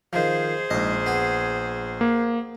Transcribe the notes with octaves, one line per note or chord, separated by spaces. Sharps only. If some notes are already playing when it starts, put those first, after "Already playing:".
D#3 F3 G#4 C5
A#1 G#2 D#5
B3 G#5
A#3